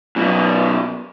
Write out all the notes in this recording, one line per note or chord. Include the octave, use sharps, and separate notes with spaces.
F#2 B2